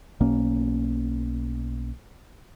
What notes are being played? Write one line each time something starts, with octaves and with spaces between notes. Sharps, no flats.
B1 B2 A#3 C#4